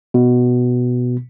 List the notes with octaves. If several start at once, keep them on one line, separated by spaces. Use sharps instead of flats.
B2